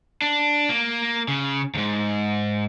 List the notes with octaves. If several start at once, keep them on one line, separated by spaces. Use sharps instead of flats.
D4
A#3
C#3
D#2 G#2